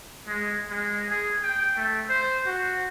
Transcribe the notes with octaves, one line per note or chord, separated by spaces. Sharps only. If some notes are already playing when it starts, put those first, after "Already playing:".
G#3
G#3
G#4
G5
A3
C5
F#4